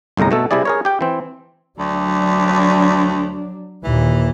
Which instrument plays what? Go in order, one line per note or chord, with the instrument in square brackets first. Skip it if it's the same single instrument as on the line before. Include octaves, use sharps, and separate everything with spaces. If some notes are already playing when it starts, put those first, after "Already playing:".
[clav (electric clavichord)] G1 C2 A2 G#3 A#5
B2 A3 A4
C3 G3 E4 G#4 D5
G#4 A#4 C#5
G4 G5
E3 C4
[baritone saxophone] D2 [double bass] F#3 D4
[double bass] D#2 A#2 [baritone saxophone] E3